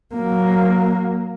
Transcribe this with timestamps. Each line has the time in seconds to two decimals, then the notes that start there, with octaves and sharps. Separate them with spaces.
0.15 F#3 A#3